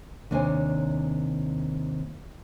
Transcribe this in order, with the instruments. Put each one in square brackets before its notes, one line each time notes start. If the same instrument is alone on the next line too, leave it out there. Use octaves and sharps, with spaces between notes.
[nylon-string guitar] D#2 C3 D4 C5 C#5 G#5